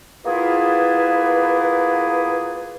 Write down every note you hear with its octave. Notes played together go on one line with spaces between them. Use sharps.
A#3 B3 E4 F4 G#4 B4